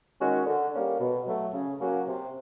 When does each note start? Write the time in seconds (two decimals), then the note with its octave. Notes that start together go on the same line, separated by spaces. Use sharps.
0.20 D#3 G#3 C#4 F#4
0.47 D3
0.73 G3 A#3 C#4
1.00 B2
1.27 F#3 A3
1.54 C#3
1.81 F#3 A#3 C#4 F#4
2.07 C3